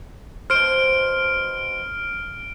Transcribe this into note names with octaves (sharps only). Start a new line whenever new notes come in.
B2 C5 F6 D7